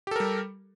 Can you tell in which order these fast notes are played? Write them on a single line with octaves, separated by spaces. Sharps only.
G4 A4 A#4 G3